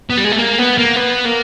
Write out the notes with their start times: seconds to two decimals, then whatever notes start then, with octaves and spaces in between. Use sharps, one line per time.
0.10 B3
0.18 G3
0.25 G#3
0.32 A3
0.38 A#3
0.59 B3
0.78 A#3
0.96 B3
1.25 A#3